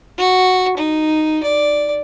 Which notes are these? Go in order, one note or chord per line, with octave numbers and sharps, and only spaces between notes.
F#4
D#4
D5